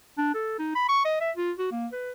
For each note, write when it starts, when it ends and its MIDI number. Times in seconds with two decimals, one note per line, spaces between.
0.18 0.35 62
0.35 0.56 69
0.59 0.74 63
0.75 0.88 83
0.89 1.01 85
1.05 1.16 75
1.21 1.31 76
1.37 1.52 65
1.59 1.68 66
1.72 1.87 58
1.92 2.12 71